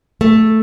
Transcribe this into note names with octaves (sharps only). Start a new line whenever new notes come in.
A3